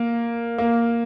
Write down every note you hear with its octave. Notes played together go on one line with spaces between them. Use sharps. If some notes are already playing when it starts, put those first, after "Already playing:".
Already playing: A#3
A#3